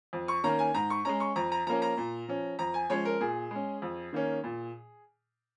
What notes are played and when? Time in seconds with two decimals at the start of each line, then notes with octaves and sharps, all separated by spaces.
0.13 F2
0.28 C#6
0.44 D#3 A#3 C#4 A#5
0.59 G#5
0.74 G#2 A#5
0.90 C#6
1.05 G#3 C#4 A#5
1.20 C#6
1.36 F2 A#5
1.52 A#5
1.67 F3 A#3 C#4 A#5
1.82 A#5
1.97 A#2
2.28 F3 C#4
2.59 F2 A#5
2.74 G#5
2.90 F3 G#3 C#4 C#5
3.05 A#4
3.20 A#2 G#4
3.51 G#3 C#4
3.82 F2
4.13 D#3 A#3 C#4
4.44 A#2